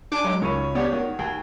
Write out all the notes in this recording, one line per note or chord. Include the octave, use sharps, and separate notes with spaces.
D4 G#5 D6
F#3 G#3
C#2 D#3 C#5 C#6 D#7
B3 D4 G4 C#5 D5
D#3 F#4
D#2 G#4 G5